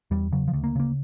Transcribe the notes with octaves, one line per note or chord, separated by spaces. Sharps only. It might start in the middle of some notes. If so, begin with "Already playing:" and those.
E2 G3
C#3 F#3
F3
D2
A#3
C#3 A#3